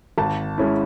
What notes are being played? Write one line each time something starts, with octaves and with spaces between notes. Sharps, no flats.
G#1 A5
G#3 C#4 E4